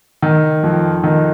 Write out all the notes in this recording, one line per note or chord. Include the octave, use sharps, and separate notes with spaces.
D#3
F2
D#3